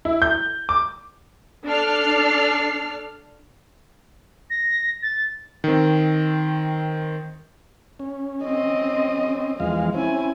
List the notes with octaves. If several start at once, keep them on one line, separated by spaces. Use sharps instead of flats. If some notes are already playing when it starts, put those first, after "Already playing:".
E4
G6
D6
D4 A4 D5 F6 C7
A#6
A6
D#3 C4
C#4
C4 D#5
E2 F3 G#3 F5
C4 C#4 E4 G#5